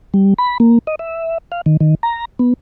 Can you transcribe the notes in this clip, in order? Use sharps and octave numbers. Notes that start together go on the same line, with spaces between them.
G3
B5
A#3
D#5
E5
F5
D#3
D#3
A#5
B3